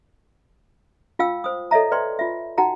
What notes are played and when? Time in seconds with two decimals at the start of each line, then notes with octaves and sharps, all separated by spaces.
1.19 F4 F5 G5 E6
1.44 C5 D#6
1.71 A4 C#5 D#5 E5 A#5
1.92 B4 D5 G5 C6
2.19 F4 E5
2.58 D#4 F#4 F#5 G5 A#5